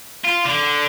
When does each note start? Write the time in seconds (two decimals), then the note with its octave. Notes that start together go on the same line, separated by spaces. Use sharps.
0.25 F4
0.46 D3